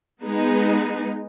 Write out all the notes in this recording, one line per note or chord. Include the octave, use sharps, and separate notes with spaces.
G#3 B3 D#4